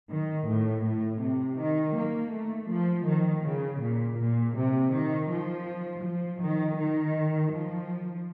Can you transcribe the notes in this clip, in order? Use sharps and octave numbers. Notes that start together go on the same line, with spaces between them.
D#3
A2
A2
C3
D#3
A#3
A3
F3
D#3
C#3
A#2
A#2
C3
D#3
F3
F3
D#3
D#3
F3